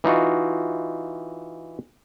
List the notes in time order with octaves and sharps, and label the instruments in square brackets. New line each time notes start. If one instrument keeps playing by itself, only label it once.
[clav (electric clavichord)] E3 D#4 F4 F#4